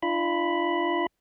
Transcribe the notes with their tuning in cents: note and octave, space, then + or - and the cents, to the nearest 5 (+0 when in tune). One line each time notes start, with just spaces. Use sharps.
D4 +35 F4 -25 B5 +0